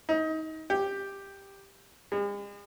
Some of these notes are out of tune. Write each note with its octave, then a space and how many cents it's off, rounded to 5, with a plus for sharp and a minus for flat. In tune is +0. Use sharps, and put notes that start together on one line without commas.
D#4 +25
G4 +5
G#3 -45